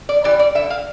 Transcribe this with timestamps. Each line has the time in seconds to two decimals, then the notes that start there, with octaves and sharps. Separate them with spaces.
0.09 D5
0.24 E3 G3 D5
0.39 D5
0.55 D3 E5
0.70 F5